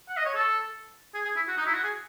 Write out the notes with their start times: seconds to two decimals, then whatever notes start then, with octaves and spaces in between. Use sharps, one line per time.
0.09 F#5
0.17 D#5
0.26 C#5
0.35 A4
1.14 G#4
1.25 G#4
1.36 E4
1.48 F#4
1.57 D#4
1.66 E4
1.74 F#4
1.84 G#4